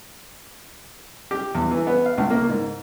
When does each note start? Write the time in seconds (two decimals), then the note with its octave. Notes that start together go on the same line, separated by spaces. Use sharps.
1.31 G4
1.55 E2
1.71 E3
1.87 B3
2.06 F5
2.18 C#2
2.31 A#3
2.49 G#2